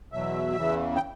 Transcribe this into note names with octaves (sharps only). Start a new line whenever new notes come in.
E2 B2 F#3 E5
E2 C#3 E3
G5